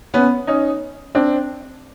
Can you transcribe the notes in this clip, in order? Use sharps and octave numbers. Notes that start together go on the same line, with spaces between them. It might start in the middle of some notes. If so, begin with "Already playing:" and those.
B3 C#4
C#4 D#4
C4 D4